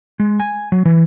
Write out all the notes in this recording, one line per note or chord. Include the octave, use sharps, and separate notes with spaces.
G#3
G#5
F#3
E3